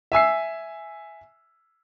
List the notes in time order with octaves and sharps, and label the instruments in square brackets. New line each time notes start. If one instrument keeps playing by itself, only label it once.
[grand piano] E5 G#5 E6 C7